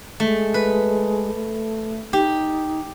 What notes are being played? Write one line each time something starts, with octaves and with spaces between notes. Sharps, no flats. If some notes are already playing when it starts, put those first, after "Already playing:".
G#3 A3
B4
A3
D#4 G4